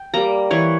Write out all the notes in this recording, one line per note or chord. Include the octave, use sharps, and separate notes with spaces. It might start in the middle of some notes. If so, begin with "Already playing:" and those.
Already playing: G5
G3 A#3 A#5
E3 C#5